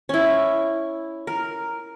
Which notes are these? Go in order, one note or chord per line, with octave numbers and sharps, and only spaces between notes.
C#4 E4
A#4